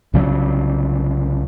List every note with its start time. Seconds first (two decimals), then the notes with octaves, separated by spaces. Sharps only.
0.13 C2 C#3 F#3